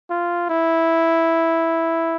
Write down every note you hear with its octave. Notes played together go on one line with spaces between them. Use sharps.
F4
E4